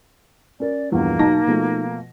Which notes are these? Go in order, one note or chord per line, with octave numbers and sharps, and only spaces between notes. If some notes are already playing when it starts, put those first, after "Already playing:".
C#4 A#4 D5
A#1 E2 G2 A#3
B1 D#4 A5 A#6
B2 F3 A3